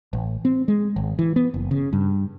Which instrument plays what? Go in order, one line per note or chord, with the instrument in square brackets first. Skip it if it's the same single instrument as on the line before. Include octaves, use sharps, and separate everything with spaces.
[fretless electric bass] A1
C4
G#3
G#1
E3
B3
F#1
C#3
G2